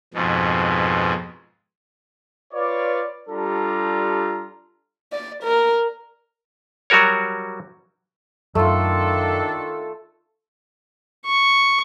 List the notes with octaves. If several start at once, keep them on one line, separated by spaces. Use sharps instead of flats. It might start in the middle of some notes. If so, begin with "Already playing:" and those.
F2 G#2 B2
F4 B4 C#5 D5
G3 D4 F4 G4 A4 A#5
D5
A#4
F#3 G3 F#4 A#4 C#5
F#2 D#3 A3 D4 F4 A4
C#6